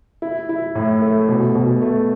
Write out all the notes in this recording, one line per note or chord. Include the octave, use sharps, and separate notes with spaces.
E4
E4
A2
A3
B2
B2
A3